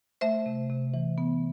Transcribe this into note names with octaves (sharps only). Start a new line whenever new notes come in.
A3 C5 E5
C3
C3
E3
B3